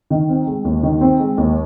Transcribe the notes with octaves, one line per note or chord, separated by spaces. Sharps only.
D#3
C4
G#3
D#2
D#3
C4
G#3
D#2